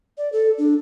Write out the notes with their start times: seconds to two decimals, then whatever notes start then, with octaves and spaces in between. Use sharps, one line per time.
0.18 D5
0.32 A4
0.58 D4